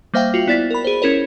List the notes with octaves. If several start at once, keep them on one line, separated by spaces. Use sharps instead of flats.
G3 A#3 C5 E5 F5 G5
F4 F#4
B3 E4 D5 A6 B6
A#4 B5
G#4 C5
C#4 E4 A#4 C#5